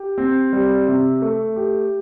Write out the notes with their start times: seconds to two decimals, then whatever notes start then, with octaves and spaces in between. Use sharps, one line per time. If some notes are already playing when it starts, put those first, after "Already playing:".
Already playing: G4
0.18 C4
0.53 G3
0.88 C3
1.22 A3
1.56 G4